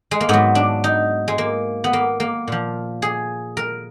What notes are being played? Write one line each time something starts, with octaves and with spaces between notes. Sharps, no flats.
G#3
A#3
G#2 F#3 B3
D4
D#4
G#3
A#3
B3
A#3
A#3
A#2 F3
G#4
A#4